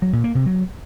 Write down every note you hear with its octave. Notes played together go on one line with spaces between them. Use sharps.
F#3
A#2
A#3
C3
F#3